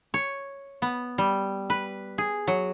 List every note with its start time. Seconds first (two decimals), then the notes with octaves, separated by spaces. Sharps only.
0.14 C#5
0.82 B3
1.18 G3
1.70 B4
2.18 G#4
2.47 F#3